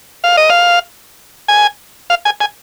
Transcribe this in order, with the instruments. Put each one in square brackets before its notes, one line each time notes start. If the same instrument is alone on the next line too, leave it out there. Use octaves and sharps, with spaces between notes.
[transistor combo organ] F5
D#5
F5
G#5
F5
G#5
G#5